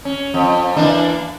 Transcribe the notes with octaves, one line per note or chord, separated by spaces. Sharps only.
C#4
F2
E3 A#3 D4